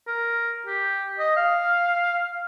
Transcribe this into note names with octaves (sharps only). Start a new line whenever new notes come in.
A#4
G4
D#5
F5